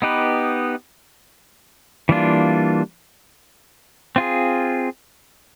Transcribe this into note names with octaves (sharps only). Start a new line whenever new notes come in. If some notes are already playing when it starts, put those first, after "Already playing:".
B3 D#4 G4 B4
E3 G3 A#3 D4 F4
C4 F4 G#4